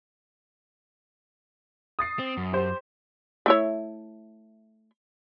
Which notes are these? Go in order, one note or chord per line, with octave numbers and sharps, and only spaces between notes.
D#6 A6 C7
C4
F#2
G4 C5
A3 E4 C#5